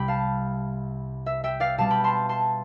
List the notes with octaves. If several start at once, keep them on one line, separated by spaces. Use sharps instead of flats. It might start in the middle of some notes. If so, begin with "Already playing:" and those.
Already playing: C2 C3 G3 G5 B5
F5 A5
E5
E5 G5
D5 F5
B2 G3 C4 F5 A5
G5 B5
A5 C6
A5 C6